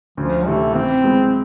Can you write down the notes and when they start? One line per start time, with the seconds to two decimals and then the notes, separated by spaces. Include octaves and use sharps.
0.17 D2 F3
0.47 C3 E3 A3
0.75 E3 C4
1.04 G#3 B3 E4